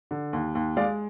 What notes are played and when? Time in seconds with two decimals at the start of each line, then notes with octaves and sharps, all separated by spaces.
0.11 D3
0.33 D#2
0.55 D#2
0.77 G#3 D5 F5